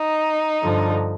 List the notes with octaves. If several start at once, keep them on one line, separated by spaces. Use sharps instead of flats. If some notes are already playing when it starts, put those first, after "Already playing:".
Already playing: D#4
G2 D3 F3